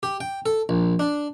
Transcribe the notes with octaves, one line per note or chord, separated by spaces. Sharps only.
G4
G5
A4
A#1
D4